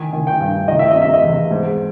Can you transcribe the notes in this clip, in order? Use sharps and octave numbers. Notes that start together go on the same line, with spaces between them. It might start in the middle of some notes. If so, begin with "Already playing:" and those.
Already playing: D#3 G#5
D#3
G5
G2
D#3 D#5
E5
C3 D#5
E5
D#5
E2
G#2